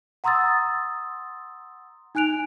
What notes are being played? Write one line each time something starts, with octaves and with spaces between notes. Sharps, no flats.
F#5 A#5 C6 D#6 E6 A6
D#4 G#5 F#6 D7 F7